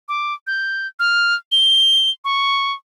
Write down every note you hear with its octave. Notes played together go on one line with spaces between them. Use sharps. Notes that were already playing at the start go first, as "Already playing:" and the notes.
D6
G6
F6
G7
C#6